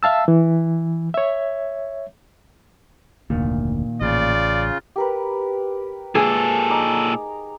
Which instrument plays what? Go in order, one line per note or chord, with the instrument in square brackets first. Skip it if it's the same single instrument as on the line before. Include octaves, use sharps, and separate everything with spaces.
[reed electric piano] E5 F5 A5 E6
E3
C#5 E5
[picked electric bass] F1 D2 [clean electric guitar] A#2 D#3
[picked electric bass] A1 [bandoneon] C#3 F4 [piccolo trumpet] D5
[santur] G4 A#4 B4
[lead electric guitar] A#2 A4 [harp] G#4
[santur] D#4 A#5 D6